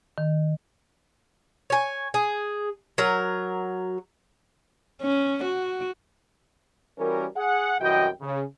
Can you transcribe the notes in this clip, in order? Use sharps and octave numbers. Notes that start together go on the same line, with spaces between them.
D#3
C#5 G#5
G#4
F#3 A#4
C#4
F#4
E3 G3 C#4 F#4 A#4
G#4 F#5
C2 F#2 E3 F#4 D#5 G5
C#3